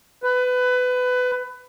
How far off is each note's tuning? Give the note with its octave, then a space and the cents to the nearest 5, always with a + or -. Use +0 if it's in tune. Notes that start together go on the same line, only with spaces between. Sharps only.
B4 +20